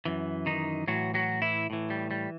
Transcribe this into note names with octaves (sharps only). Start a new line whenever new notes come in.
F#2 E3
D#3 D#4
A2 E3 F#3 F#4
F#3 F#4
E3 E4
A2 E3
G3
G3